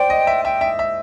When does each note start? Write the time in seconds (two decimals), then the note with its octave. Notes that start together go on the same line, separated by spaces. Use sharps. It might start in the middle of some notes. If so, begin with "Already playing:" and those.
Already playing: C5 D5 G5
0.10 D#5
0.27 E5
0.45 E5 G5
0.61 E5
0.79 E5